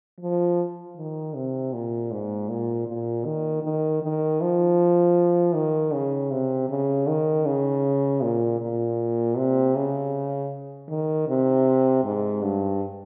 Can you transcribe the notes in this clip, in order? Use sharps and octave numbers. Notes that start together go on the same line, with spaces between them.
F3
D#3
C3
A#2
G#2
A#2
A#2
D#3
D#3
D#3
F3
D#3
C#3
C3
C#3
D#3
C#3
A#2
A#2
C3
C#3
D#3
C3
G#2
G2